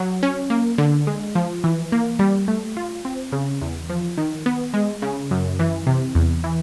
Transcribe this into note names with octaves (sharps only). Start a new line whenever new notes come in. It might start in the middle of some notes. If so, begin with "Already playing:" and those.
Already playing: F#3
C#4
A#3
D3
G#3
F3
E3
A#3
G3
A3
F4
C4
C#3
E2
F3
D#3
B3
G#3
C#3
F#2
E3
C3
E2
E3